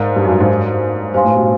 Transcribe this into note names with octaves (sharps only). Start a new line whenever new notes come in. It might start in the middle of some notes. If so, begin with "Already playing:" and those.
Already playing: G#2 A#4 D5 F5 A#5
G2
F#2
G2
G#2
G2 C5 F5 G#5 C6
A2
B2